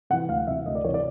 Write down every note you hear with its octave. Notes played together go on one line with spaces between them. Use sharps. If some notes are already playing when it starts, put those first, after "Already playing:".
C3 E3 F#5
D2 F5
C3 E3 E5
D2 D#5
D5
C3 E3 C#5
D5